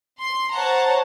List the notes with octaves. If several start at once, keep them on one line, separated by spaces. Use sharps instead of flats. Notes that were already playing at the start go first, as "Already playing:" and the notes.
C6
C5 C#5 F#5 A5 A#5